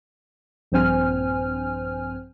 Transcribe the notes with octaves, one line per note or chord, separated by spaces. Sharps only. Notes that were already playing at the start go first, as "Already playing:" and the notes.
A#1 G2 C4 C5 G#5 F6